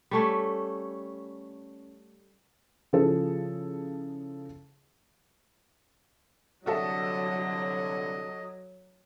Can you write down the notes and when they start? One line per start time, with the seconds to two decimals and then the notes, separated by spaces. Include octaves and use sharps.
0.11 G3 A3 C#4
2.93 C#3 F3 E4 G#4 A4
6.66 C2 D3 F#3 F#4 A4 D#5 E5